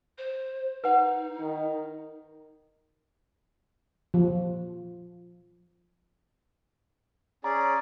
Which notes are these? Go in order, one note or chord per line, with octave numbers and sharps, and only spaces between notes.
C5
D#4 B4 F#5
D#3
F3
C#4 G#4 D5 A#5